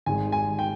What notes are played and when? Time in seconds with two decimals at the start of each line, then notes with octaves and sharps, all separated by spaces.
0.06 G#1 G#2 D#3 G#3 G#5
0.32 G#5
0.59 G5